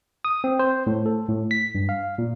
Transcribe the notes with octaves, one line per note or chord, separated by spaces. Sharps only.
D#6
C4
C5
A2
A4
A2
B6
G2
F5
A#2